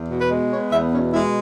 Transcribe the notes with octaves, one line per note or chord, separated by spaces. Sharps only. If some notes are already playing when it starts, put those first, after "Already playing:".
Already playing: E2
B2
B4
G#3
B3 C#5
E2 E5
B2 C#4
G#3 E4